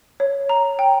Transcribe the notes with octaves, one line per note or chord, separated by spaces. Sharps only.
C#5
A#5
G5